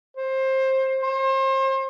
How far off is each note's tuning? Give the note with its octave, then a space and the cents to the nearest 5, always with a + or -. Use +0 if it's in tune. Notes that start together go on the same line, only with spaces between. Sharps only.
C5 +20
C5 +35